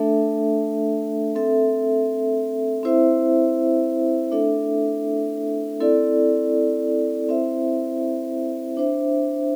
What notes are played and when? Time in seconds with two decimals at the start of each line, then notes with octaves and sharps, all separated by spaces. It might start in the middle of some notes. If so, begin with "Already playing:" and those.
Already playing: A3 D4 A4 E5
1.35 C4 A4 E5
2.83 C4 E4 C5 E5
4.32 A3 D4 A4 E5
5.80 C4 E4 A4 D5
7.29 C4 E4 C5 E5
8.77 D4 C5 E5